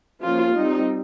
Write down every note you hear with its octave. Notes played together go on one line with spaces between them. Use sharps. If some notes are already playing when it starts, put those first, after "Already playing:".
F3 A#3 C#4 F4
G3 C4 D#4